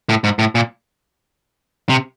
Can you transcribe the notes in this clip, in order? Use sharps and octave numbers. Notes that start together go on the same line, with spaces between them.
A2
G#2
A2
A#2
C3